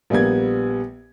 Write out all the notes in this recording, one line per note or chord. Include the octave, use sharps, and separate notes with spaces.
A#1 G3 A#3 B3 G#6